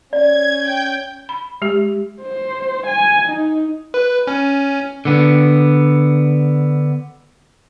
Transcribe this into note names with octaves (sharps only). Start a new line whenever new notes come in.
C#4 D5 G#6
G5 G6
B5
G#3 G4
C5
G#5
D#4
B4
C#4
D3 B3